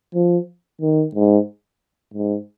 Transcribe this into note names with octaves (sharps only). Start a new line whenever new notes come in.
F3
D#3
G#2
G#2